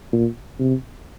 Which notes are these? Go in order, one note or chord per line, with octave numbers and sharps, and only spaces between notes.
A#2
C3